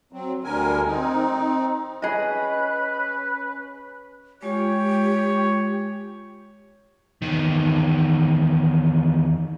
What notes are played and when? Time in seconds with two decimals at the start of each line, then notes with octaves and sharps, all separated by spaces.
0.12 F#3 C4
0.44 D2 D3 G3 A#4 G#5
0.85 C4 D#4
2.02 C#4 G#4 B4 D#5
4.43 G#3 F4 G4 C#5
7.22 E2 D#3